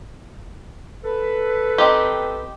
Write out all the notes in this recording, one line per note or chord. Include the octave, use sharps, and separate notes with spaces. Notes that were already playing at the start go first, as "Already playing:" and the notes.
A4 B4
C4 D#4 G4